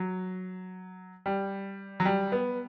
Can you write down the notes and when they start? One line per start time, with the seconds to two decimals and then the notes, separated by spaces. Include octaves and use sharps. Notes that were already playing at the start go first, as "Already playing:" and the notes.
Already playing: F#3
1.26 G3
2.00 F#3
2.05 G3
2.32 B3